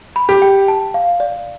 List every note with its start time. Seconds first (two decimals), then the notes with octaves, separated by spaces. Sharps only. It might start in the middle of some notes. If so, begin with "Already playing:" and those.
0.16 B5
0.29 G4
0.42 G5
0.68 A5
0.94 F5
1.20 D5